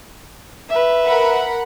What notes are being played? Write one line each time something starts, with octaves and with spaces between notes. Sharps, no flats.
B4 E5
A#4 F#5 B5